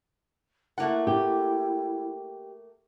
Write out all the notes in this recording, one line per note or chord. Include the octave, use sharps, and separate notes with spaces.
A3 A#3 E4 F#5
G4